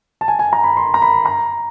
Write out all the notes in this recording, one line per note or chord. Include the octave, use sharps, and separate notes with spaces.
A5
G#5
G#5
A#5
B5
C6
A#5
B5
A#5